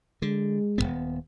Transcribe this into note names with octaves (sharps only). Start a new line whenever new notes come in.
D3 G#3
D#1 F#2 B3